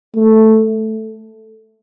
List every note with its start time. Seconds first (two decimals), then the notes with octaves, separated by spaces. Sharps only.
0.16 A3